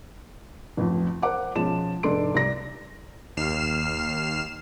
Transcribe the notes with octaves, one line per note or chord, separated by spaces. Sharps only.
A1 F2 F3
A#4 C5 F#5 D6
B2 F3 G#3 C#4 A5 E7
F1 G#2 D4 A4 C6 D7
C2 D5 A#6
D#2 F6 C7 E7